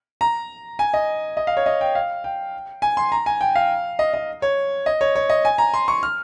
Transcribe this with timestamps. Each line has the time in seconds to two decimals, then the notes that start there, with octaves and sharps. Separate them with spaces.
0.21 A#5
0.79 G#5
0.94 D#5
1.37 D#5
1.47 F5
1.57 C#5
1.66 D#5
1.81 G5
1.95 F5
2.24 G5
2.82 G#5
2.97 C6
3.12 A#5
3.26 G#5
3.41 G5
3.56 F5
3.99 D#5
4.14 D#5
4.42 C#5
4.86 D#5
5.01 C#5
5.15 C#5
5.30 D#5
5.45 G#5
5.58 A#5
5.74 C6
5.88 C#6
6.03 F6